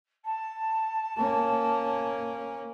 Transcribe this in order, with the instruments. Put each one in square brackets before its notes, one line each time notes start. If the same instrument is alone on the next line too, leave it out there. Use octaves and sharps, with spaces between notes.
[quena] A5
[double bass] A#3 C#4